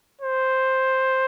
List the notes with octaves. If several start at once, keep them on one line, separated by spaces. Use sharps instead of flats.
C5